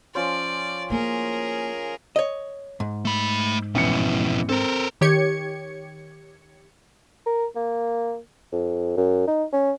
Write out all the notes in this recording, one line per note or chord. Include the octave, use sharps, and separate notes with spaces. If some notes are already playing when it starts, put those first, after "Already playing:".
F3 C#4 C5 D5
A#3 E4 G#4 A#4
C#5 D#5
G#2
A3 B5
A1 F2 B2 E3 C#7
C4 A4 A#4
D#3 G4 C#5 G#6 C#7
A#4
A#3
F2
F#2
D#4
C#4